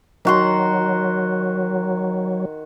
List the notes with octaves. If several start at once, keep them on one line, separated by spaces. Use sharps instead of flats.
D#3 F#3 F#4 C6